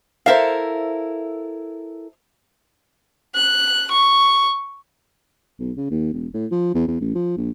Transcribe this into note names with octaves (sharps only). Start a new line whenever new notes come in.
E4 A4 A#4 C5 E5 F5
F#6
C#6
B1
C#3
D#2
E1
A2
F3
E2
E2
A1
F3
A#1